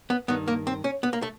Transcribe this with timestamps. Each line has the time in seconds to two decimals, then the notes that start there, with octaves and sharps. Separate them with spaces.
0.10 B3
0.28 G2 D#3 B3
0.48 A#3
0.67 C4
0.84 C#4
1.03 B3
1.13 A#3
1.22 A3